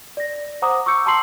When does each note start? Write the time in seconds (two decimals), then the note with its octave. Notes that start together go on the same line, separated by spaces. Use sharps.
0.17 D5 A#6
0.62 C5 F#5 A#5 D6 D#6
0.86 C#6 D6 E6 G6 C#7
1.06 A5 A#5 C6 E6 C7 F#7